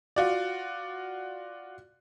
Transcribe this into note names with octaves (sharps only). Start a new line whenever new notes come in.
F4 F#4 D5